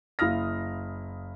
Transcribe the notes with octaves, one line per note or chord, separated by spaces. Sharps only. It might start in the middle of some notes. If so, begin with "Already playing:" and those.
F#1 E4 F5 D#6 F6 A#6